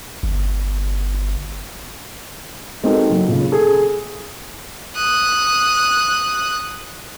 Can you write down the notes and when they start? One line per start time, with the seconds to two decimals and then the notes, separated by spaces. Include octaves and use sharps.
0.23 G1
2.84 G#3 C4 D#4 F#4 A4 A#4
3.10 F#1 F#3
3.28 A#2 C#3
3.52 G#4 A4
4.96 D#6 F#6